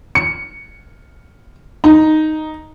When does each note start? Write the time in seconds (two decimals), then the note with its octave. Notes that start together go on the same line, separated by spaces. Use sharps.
0.15 C#7
1.84 D#4